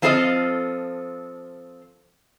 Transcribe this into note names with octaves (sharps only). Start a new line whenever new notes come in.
F3 C4 F4 A4 D5 D#5